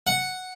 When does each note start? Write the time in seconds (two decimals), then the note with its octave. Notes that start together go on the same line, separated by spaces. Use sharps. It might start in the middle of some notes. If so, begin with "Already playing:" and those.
0.07 F#5